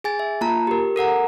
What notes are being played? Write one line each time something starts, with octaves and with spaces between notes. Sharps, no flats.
G#4 G#5 A6
E5
A#3 F4 A5 A#5
G4 A#4
A4 A#4 F#5 A#5